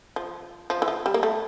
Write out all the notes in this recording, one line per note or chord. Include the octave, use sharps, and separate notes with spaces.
F3
F3
E3
F3
G3
A#3
A3